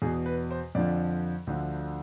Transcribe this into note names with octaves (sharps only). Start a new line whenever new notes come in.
E2 B2 G#4
B4
C5
F2 D3 F3 D5
D2 D3 F3